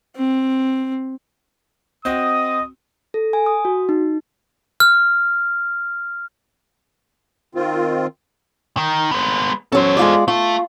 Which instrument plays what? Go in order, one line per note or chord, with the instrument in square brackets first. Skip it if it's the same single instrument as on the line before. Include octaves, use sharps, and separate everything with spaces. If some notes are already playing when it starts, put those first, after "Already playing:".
[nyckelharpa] C4
[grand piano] C4 F#4 [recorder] D#5 [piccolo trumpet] D#6
[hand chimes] A4
G#5
D#6
F#4
D#4
[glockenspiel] F6
[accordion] D#3 C4 F4
[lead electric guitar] D#3
G#3 B3
[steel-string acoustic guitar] F#3 C#4 [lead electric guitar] A4 C5
[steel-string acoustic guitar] G#3 F4 D5
[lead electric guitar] A3 [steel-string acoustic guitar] F4